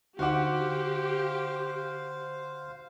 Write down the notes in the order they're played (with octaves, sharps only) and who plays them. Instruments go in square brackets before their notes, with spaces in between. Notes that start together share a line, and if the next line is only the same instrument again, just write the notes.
[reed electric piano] D3 D#4 D6 [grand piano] F#4 F#5 [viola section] G4 [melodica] C5 F5